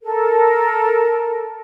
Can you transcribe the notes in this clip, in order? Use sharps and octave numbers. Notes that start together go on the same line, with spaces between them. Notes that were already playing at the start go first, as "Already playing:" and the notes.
A4 A#4